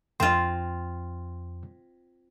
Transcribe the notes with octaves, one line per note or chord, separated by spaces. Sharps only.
F2 C4 F4 C6